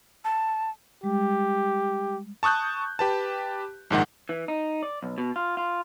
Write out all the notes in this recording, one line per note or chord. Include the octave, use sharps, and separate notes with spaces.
A5
G3 G#3 G4
A5 C#6 D#6 F#6 G6
G4 B4 A5
A#1 G#2 D#3 F#5
E3
D#4
D5
B1
B2
F4
F4